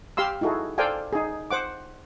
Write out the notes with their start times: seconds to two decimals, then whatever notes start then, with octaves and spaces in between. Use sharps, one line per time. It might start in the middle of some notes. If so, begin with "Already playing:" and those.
0.17 G4 F5 C6 E6
0.41 D#4 E4 F#4 G#4 A4
0.78 A4 C5 D5 F5 G5 G#5
1.13 D#4 G#4
1.51 C5 F#5 D6